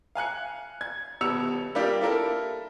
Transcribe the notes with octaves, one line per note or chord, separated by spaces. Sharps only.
F5 G#5 F#6 C#7
G#6
D#1 B2 E6 C#7 F7
G3 A#3 D4 F4 G4
E4 F4 A4 A#4